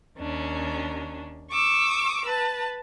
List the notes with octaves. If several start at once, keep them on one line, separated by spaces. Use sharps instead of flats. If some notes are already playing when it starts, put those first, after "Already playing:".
D#2 C#4 D4
C#6 D6 E6
B4 A5